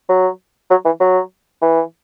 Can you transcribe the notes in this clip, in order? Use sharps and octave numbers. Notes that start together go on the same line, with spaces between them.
F#3
F#3
E3
F#3
E3